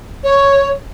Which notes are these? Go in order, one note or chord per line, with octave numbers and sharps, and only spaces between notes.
C#5